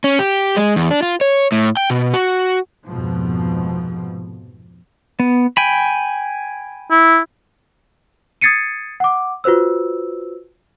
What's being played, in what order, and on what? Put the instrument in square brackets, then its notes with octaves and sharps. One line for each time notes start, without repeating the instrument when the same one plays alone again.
[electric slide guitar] C#4
G4
G#3
E2
D4
F4
C#5
A2
G5
B2
F#4
[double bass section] F1 F2 G#2 B2 F3
[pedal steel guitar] B3
G5 G#5 B5
[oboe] E4
[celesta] D#6 G#6 A6 C7 C#7 D#7
F#5 D6
F4 F#4 B4 C5 E6